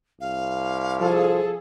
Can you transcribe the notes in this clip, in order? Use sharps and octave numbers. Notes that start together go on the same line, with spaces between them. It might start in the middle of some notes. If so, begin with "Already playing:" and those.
C2 F5
F3 G#4 A4